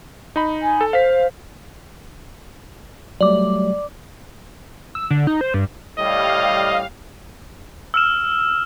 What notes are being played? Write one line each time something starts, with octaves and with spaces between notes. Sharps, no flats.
D#4 B5
G#5
A4
C5 F5 B6
F#3 G3 A3 D5 D6
E6
D3
D#4
C5
G2
A2 G3 D#5 F5
E6 F6 E7